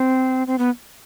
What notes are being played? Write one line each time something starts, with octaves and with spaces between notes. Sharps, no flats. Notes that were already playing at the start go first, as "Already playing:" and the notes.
Already playing: C4
C4
B3